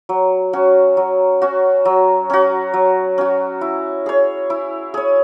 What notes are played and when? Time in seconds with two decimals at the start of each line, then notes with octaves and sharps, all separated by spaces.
0.09 F#3
0.53 C#4 F#4
0.97 F#3
1.42 C#4 F#4
1.85 F#3
2.30 C#4 F#4
2.74 F#3
3.18 C#4 F#4
3.61 E4
4.06 G#4 C#5
4.50 E4
4.94 G#4 C#5